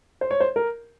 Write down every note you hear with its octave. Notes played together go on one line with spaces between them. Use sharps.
C5
C#5
C5
A#4